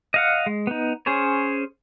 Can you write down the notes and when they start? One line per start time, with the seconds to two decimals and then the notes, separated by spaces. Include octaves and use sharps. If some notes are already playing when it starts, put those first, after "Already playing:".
0.14 D#5 F5 F#5
0.46 G#3
0.67 B3 D#4
1.06 C#4 G#4 C5 C#5